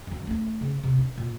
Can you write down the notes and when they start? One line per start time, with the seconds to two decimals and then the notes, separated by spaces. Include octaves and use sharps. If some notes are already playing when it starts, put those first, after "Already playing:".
0.07 F#2 D#3
0.27 A3 D#4
0.61 C#3
0.83 C3
0.98 D4
1.18 A#2